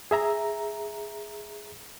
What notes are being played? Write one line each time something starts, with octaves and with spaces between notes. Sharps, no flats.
G#4 E5 A#5